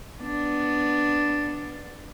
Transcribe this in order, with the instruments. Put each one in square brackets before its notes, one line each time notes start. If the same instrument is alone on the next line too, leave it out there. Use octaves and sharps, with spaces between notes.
[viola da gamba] B3 D4